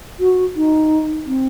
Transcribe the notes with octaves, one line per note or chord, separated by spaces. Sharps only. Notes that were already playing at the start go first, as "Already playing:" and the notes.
F#4
D#4
C4